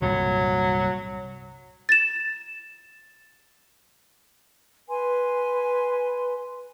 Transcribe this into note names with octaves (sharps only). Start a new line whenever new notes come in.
C2 G2 A#2 F#3
A6 E7
B4 G#5 C6